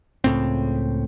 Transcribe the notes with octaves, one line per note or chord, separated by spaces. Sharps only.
C#2 A2 C4